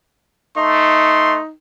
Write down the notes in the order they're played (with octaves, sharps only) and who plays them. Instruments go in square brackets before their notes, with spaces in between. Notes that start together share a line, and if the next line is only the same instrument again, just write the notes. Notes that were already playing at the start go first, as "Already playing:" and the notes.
[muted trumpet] A3 [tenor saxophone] D#4 [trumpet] C6